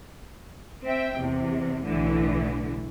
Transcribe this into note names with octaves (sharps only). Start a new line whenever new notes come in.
C4 E5 G5
E2 C3
B1 A2 D3 E3